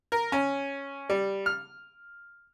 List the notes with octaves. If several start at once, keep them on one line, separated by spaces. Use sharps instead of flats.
A#4
C#4
G3
F6